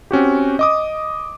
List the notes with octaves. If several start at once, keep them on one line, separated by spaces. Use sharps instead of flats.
C4 C#4 F#4 G4
D#5 D6 D#6